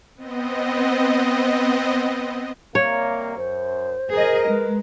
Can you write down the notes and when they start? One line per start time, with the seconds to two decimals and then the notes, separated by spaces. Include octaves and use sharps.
0.16 B3 C4 D#5
2.75 C3 G3 A#3 C#5
3.37 F#2 C5
4.12 G#4 A#4 D#5
4.48 G#3 B4